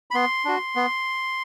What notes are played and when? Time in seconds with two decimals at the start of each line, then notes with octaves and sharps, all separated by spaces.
0.11 B5
0.14 B3 C6
0.45 D4 F#4
0.76 B3